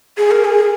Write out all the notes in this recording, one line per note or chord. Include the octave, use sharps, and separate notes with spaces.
G#4
A#4
G#4